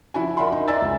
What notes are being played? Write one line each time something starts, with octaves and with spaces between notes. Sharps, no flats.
F3 E4 F#4 G#5
A#4 D5 E5 F#5 B5 C6
D#4
D5 E5 G#5 A#5 E6 A6
C#2